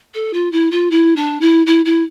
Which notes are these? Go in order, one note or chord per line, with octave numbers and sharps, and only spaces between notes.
A4
F4
E4
F4
E4
D4
E4
E4
E4